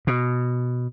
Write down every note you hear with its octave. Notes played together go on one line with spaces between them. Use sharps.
B2